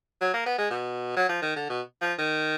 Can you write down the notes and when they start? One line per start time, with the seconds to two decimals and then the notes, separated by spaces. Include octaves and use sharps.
0.21 F#3
0.34 A#3
0.46 B3
0.58 G#3
0.71 B2
1.17 F#3
1.29 F3
1.42 D#3
1.56 D3
1.69 B2
2.02 F3
2.19 D#3